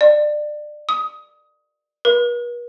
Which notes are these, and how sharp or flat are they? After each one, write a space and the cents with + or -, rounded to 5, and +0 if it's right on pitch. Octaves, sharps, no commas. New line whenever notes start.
D5 +25
D#6 +20
B4 -45